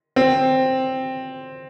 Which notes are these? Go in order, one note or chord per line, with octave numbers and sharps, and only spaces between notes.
C4